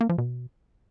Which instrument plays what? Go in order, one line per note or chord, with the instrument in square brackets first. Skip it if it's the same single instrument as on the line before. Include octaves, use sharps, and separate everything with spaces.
[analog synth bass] A#3
F3
B2